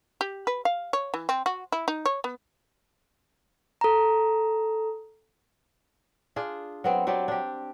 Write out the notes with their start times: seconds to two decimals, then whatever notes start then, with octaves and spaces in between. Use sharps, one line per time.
0.21 G4
0.47 B4
0.65 F5
0.93 C#5
1.14 E3
1.29 C4
1.46 F#4
1.72 E4
1.88 D#4
2.05 C#5
2.24 B3
3.81 A4 A#5
6.36 D4 F4 G#4
6.84 F#3 B3 C4
7.07 F#3 C4 G4 D5
7.28 D4 G4